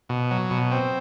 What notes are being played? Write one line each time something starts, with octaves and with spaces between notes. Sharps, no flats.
B2
F#3
B2
C4